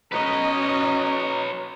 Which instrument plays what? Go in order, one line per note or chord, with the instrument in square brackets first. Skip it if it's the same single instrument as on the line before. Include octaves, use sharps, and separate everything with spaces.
[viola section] C#4 F#4 D#5 [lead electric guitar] B4 C#5 [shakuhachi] A#5